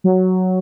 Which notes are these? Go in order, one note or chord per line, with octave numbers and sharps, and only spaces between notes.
F#3